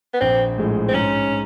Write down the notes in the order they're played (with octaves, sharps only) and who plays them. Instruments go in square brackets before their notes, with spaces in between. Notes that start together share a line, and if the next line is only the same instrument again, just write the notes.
[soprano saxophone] B3
[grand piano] A#1 [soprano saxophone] C4
[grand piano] A2 F3 G#3
[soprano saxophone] C4
[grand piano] G#2 [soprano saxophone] C#4